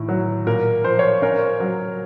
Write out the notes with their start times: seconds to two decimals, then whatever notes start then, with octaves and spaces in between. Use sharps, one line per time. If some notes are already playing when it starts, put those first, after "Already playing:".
Already playing: A2 D#3
0.09 F#3
0.46 A#2 A#4
0.85 F3 C5
0.99 C#5
1.03 C5
1.22 C#4 A#4 C#5
1.60 F#3